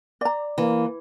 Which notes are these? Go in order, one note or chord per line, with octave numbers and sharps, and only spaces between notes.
D5 A#5
E3 A#3